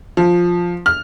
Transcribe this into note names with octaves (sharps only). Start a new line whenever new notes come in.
F3
F6